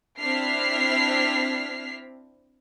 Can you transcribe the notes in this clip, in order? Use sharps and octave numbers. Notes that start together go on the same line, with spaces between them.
C4 D4 E4 F6 B6 C7